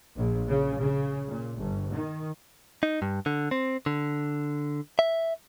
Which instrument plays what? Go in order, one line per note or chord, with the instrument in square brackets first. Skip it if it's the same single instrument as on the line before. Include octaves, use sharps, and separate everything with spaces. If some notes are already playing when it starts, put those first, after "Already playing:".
[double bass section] A#1
C#3
C#3
A#2
G1
D#3
[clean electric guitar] D#4
G2
D3
C4
D3
E5